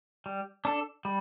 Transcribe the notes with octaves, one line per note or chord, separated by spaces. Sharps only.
G3
D4 A4
G3